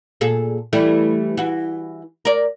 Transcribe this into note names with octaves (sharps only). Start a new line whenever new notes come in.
A#2 G#4 A4
E3 G3 A3
E3 F#4
A#4 D5